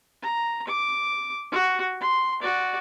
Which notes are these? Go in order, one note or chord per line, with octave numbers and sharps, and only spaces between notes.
A#5
D6
F#4
C6
F#4 D5